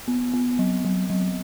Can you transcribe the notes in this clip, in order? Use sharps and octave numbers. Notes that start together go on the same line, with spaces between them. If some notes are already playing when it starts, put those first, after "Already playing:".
B3
B3
F#3
F#3
F#3